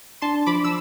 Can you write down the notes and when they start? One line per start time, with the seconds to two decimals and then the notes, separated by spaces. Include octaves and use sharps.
0.22 D4 A5 C6
0.46 F3 B5 D6
0.64 E6